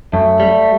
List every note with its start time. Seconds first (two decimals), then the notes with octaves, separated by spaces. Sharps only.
0.13 F#2 A3
0.40 G3